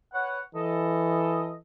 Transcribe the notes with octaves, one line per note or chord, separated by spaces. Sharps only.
B4 C#5 F#5
E3 A4 D#5